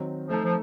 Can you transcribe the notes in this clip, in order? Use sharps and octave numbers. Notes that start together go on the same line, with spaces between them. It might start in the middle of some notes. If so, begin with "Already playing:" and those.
Already playing: D#3 F#3 C4
F3 A3 D#4 A4
F3